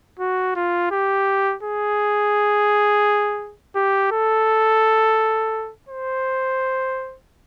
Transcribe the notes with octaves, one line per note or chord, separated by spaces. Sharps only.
F#4
F4
G4
G#4
G4
A4
C5